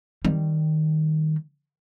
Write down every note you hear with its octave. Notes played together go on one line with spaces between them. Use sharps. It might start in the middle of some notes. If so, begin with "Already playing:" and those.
D#3 G3